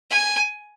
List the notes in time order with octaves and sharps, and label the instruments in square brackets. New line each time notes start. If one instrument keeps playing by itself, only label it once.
[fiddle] G#5